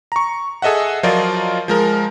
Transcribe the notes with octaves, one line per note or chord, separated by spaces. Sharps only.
A#5 C#6
G#4 A4 D#5 E5 F#5
F3 F#3 F4 A#4 D5 D#5
F3 G#3 A#4